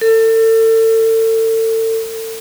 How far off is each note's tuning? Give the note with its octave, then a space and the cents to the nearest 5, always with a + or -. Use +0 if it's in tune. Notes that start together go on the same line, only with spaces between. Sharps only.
A4 +35